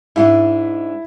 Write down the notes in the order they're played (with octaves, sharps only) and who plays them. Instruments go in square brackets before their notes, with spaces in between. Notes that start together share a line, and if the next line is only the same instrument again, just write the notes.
[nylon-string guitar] G#2 G#3 D4 [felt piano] E4 E5